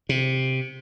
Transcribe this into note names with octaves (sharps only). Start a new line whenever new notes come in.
C3